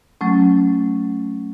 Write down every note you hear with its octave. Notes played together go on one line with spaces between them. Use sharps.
F#3 A3 C#4